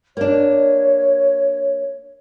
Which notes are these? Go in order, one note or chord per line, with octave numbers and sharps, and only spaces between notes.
A#3 D4 C#5